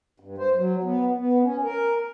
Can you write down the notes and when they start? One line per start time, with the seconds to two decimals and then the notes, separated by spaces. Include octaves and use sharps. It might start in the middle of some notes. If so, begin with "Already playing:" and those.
0.20 G2
0.38 C5
0.56 F#3
0.83 B3
1.18 B3
1.43 C#4
1.63 A#4